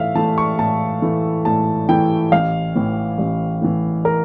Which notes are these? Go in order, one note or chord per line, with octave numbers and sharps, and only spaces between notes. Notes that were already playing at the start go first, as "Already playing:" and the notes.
Already playing: A2 E3 A3 E5 F5
E3 A3 E4 A5
C#6
A2 A5
E3 A3 E4
A2 A5
E3 A3 E4 G5
A1 F5
A2 E3
A1
A2 E3
A#4